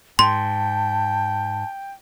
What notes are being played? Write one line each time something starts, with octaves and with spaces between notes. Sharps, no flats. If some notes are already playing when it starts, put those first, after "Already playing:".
G#2 G5 A5 C6